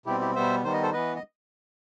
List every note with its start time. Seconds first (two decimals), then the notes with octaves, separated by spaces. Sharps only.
0.06 B2 G3 C4 E4 G4
0.21 E4 G4
0.35 B2 G3 B3 C5 E5
0.64 D#3 G3 B3 C5
0.73 D#5
0.82 A4 C5
0.93 E3 B3 B4 D#5
1.16 D#5